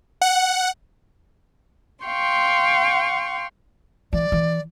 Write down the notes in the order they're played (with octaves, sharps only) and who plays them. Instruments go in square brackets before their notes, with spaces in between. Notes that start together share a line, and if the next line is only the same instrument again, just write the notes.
[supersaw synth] F#5
[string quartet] F5 G5 C6 C#6
[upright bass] E3 [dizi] D5
[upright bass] E3